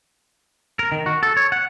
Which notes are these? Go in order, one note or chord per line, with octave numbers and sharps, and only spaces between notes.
A#4
D#3
F#4
A4
C#5
F#5